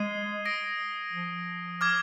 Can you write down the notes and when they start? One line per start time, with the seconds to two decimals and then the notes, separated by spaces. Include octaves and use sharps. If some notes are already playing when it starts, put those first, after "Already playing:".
Already playing: G#3 D#6 G#6 C7 D#7 G7
0.46 D#6 A#6 D7
1.13 F3
1.81 D6 F6 G#6